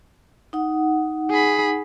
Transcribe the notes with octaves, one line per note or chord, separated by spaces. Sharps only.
D#4 F#5
G#4 B5